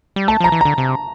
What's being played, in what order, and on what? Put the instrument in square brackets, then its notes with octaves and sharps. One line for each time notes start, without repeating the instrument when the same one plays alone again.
[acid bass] G3
[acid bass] A3 [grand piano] A5
[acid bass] F3 [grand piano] A#5
[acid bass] E3
[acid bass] D3 [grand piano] A#5
[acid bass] C3